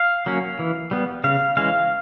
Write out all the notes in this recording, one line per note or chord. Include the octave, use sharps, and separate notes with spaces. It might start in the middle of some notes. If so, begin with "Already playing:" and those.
Already playing: F5
F#3 A#3 C#4
E3
G3 B3
C#3 F5
E3 G#3 C#4 F5